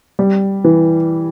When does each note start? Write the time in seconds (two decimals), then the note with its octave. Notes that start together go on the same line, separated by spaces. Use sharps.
0.19 G3
0.64 E3